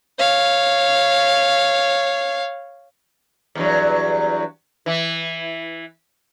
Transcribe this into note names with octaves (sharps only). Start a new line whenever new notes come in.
C#5 F5
E2 G2 F#3
E3 E4